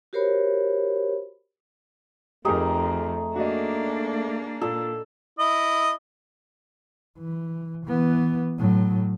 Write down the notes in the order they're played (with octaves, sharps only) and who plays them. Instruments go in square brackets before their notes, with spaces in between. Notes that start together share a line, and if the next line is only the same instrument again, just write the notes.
[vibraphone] F#4 G4 A#4 C5 C#5 B5
[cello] F2 [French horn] A3 [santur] D#4 G#4 [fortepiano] G4 A#4
[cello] A#3 D4 [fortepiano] F#4 D5 D#5
[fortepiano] A#2 [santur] A4
[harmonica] E4 D#5
[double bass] E3
E3 B3
A2 F#3